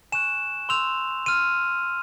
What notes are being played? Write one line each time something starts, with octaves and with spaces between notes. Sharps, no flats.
G#5 C#6 F#6 E7
C6 E6 G6 F7
C6 F6 D#7